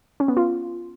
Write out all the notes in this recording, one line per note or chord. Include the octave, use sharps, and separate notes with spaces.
C#4
B3
F4